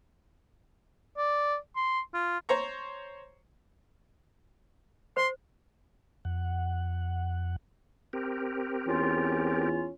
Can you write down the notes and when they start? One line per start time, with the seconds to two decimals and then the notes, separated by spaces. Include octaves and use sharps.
1.17 D5
1.76 C6
2.14 F4
2.49 C5 C#5 A#5 C#6
5.17 C5 C6
6.25 F2 F#5
8.13 C4 G4 A#4
8.87 E2 C#4 F4